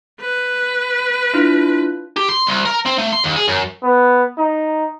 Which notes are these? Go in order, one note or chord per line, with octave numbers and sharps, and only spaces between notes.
B4
D4 E4 F4
G4
C6
C2
A#4
C4
A3
C6
D#2
G#4
F#2
B3
D#4